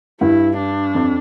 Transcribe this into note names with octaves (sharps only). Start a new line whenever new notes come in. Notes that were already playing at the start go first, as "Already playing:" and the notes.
G2 E4
D4
F2